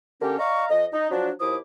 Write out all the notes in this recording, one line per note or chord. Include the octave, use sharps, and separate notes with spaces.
D3 A#3 C#4 G4
D5 D#5 F5 A#5 C#6
F2 D#5
D#4
F3 F#3 D4
D#2 F3 E4 D6 D#6